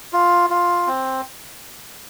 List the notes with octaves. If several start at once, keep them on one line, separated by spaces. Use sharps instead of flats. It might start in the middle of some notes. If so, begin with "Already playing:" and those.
F4
F4
C4